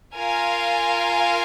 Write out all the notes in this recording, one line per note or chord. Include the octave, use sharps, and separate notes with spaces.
F4 A#4 F5 G#5